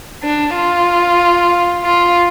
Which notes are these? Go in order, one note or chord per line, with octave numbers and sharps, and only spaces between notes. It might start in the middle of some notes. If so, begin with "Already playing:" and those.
D4
F4
F4